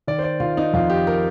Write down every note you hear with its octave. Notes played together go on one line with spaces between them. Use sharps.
D#3 D5
C5
D5
D#3 F4
D#4
F2 F4
G4
A#4